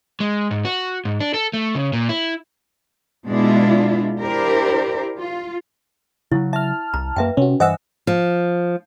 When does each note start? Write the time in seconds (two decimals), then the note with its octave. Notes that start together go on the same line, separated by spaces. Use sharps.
0.20 G#3
0.51 G#2
0.65 F#4
1.05 G#2
1.20 D4
1.34 A4
1.53 A3
1.75 C#3
1.93 A#2
2.09 E4
3.26 B2 G#3 D4 E4 F4
4.21 D4 E4 G4 A#4 C5
5.18 F4
6.32 C#3 F3 F#3 E4
6.53 E5 A5 F6
6.94 C2 A#5
7.16 F#2 A#3 B4 E5 G5
7.37 C3 C#4 F#4
7.60 G2 E3 C5 D#5 E5 F#5 G#5 E6
8.07 F3